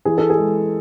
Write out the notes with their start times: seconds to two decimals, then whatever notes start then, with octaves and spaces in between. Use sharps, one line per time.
0.05 E3 G#4
0.18 A4
0.30 G#4
0.37 G#3